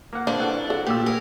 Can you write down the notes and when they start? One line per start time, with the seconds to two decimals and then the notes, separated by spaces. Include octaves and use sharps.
0.13 A#3 F#5
0.27 F3 D4 B4 A#5
0.39 C2 A4 F#5
0.70 F#4 A4
0.87 A#2 G4 E6
1.06 G#4 A#4